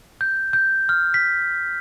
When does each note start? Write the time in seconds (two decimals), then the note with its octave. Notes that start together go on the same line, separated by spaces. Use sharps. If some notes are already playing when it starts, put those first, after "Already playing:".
0.21 G6
0.53 G6
0.89 F6
1.14 B6